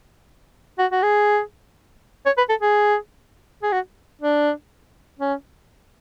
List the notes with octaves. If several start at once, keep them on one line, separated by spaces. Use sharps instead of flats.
F#4
F#4
G#4
C#5
B4
A4
G#4
G#4
F#4
D4
C#4